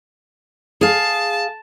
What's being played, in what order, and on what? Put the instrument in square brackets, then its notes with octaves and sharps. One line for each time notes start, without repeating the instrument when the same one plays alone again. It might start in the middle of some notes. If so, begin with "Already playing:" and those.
[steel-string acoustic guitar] G#4 F5 [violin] A5